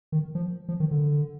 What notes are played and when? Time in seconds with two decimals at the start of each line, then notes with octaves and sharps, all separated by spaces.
0.12 D#3
0.35 F3
0.69 F3
0.80 D#3
0.91 D3